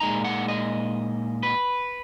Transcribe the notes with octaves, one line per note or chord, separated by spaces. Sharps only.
A#2 G#3 D#4 A#5
F#5
D#5
B4